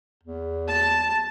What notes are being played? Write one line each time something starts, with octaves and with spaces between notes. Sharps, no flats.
E2
A5